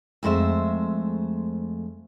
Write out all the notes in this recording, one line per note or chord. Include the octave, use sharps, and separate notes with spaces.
F2 G#3 A3 C5 E5